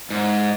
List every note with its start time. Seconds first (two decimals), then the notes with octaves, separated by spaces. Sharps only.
0.10 G#2